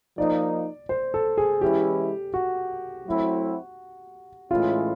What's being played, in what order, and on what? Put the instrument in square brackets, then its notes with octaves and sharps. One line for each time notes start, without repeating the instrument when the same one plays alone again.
[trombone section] F3 A#3 D#4 [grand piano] D5
[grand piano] C5
A4
G#4
[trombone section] E3 G#3 C#4 E4 [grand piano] G4
[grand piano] F#4
[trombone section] F#3 A3 C4 E4
[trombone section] A2 E3 G#3 C#4 E4 [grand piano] F4